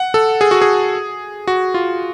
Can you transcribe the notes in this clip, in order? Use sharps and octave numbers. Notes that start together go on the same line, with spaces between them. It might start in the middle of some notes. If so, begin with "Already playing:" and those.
Already playing: F#5
A4
G#4
F#4
G#4
F#4
F4